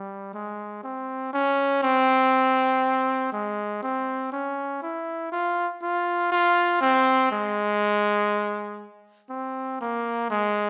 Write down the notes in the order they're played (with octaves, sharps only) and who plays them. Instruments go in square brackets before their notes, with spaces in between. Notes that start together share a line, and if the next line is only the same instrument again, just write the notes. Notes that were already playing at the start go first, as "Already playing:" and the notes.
Already playing: [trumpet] G3
G#3
C4
C#4
C4
G#3
C4
C#4
E4
F4
F4
F4
C4
G#3
C4
A#3
G#3